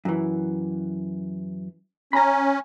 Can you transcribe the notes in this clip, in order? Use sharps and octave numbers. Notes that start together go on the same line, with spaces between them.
F#2 E3
C#4 A#5 B5